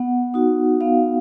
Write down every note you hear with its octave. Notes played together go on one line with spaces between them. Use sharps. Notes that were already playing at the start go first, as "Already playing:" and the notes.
Already playing: B3 F#5
D#4 F#4
B3 F5